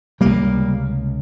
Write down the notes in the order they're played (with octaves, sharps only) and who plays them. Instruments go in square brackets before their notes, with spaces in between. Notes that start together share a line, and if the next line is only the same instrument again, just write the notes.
[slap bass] C#2 C3 G3 A#3